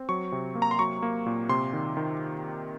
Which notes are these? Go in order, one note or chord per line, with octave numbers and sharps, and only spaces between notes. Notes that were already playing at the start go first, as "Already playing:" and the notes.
Already playing: C4
F#3 C#6
C3
A#3
A#5
C6
F#3 C#6
A#3
A#2
C3 C6
D#3
D#3